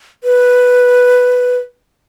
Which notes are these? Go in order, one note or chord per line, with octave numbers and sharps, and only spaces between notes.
B4